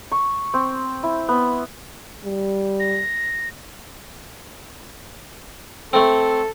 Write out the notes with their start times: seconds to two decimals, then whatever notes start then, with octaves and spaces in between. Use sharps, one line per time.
0.11 C#6
0.54 C4
1.03 E4
1.28 B3
2.25 G3
2.80 A#6
5.93 A3 C4 A4